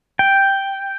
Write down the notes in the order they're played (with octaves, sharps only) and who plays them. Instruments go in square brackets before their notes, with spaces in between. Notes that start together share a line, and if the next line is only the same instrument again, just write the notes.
[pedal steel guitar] G5